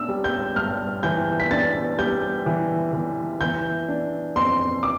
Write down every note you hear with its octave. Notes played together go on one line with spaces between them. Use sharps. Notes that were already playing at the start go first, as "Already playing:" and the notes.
Already playing: D4 E6
G3
G6
G2 F6
E3 G6
B6
D4 A6
G3 G6
E3
E3
E3 G6
D4
F2 C6
D6